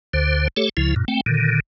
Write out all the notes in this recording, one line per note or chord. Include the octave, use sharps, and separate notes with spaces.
D2 D3 C5
A3 G4 A4 C#5
C#2 C#3 F3 E4
F#2 A#2
A3 C4 G5
A#2 D3 D#3